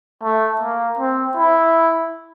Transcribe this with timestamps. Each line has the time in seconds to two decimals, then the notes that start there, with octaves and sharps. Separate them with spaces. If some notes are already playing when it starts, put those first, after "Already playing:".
0.23 A3
0.61 A#3
0.98 C4
1.37 E4